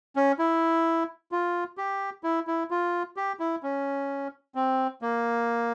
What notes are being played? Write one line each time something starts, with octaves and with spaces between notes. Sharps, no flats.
C#4
E4
F4
G4
E4
E4
F4
G4
E4
C#4
C4
A#3